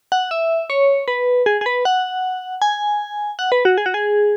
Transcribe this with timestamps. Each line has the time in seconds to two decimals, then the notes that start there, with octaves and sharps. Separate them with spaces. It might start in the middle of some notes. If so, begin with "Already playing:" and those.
0.12 F#5
0.31 E5
0.70 C#5
1.08 B4
1.46 G#4
1.61 G#4
1.66 B4
1.85 F#5
2.62 G#5
3.39 F#5
3.52 B4
3.65 F#4
3.78 G#4
3.86 F#4
3.94 G#4